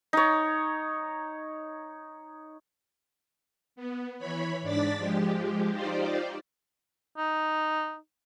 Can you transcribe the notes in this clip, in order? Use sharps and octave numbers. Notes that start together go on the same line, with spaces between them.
D#4 C#5
B3
E3 C#5 B5
G#2 D4 D5 A6 B6
F3 G#3 G4
D#4 F4 G4 C5 D5
D#4